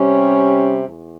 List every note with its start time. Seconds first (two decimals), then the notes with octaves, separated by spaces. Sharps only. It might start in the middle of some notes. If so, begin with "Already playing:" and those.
Already playing: C3 G3 C#4
0.88 E2